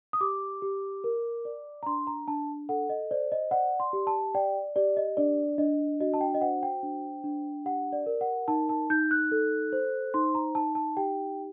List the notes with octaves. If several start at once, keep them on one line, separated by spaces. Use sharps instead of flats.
D#6
G4 D6
G4
A#4
D5
A#5
D4 C6
A#5
D4 A5
A4 F#5
D#5
C5 D5
D#5
D5 F#5
C6
G4
A5
D5 G5
G4 D5
D#5
D4 D5
D4 D#5
F#4 D#5
A5
G5
D#5
C5 F#5
G5
D4
D4
G4 F#5
D5
A#4
F#5
D#4 A5
A5
D#4 G6
F#6
A4
C5
D#4 C6
A#5
D#4 A5
A5
G4 G5